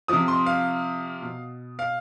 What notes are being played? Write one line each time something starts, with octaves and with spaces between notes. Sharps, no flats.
C3 F3 D#6
C6
F5
B2
F5